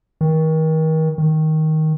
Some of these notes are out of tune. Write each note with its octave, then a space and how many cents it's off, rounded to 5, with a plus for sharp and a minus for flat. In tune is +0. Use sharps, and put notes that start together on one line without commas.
D#3 +35
D#3 +10